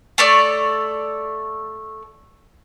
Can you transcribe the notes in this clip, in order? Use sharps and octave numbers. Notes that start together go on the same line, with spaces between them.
A3 A4 C#5 D5